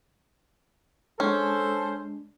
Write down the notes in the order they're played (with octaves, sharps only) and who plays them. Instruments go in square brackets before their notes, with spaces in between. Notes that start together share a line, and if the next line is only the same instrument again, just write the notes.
[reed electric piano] G#3 D4 [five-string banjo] C#4 [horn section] A4 C5